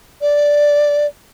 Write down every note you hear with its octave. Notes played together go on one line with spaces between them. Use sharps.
D5